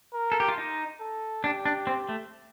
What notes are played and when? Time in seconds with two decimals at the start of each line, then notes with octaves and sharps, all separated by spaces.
0.13 A#4
0.32 A4
0.40 G4
0.48 F4
0.58 D#4
1.00 A4
1.44 D4 G4
1.65 D4
1.87 C4
2.09 A3